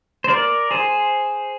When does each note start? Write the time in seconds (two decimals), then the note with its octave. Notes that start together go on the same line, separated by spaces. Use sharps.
0.24 C5
0.28 A#4 D5
0.71 G#4 C5